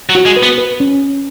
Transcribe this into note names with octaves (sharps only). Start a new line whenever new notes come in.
F#3
F#4
G#3
B4
B3
B4
C#4